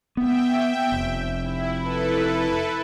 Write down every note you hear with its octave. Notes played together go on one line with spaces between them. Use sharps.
B3 E5 G5
F1
E4
E4 A4 B4